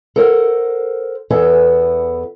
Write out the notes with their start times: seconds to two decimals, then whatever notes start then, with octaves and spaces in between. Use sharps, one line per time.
0.16 A4 A#4 C5 F#5
1.30 E2 E3 B3 A4 E5 G#5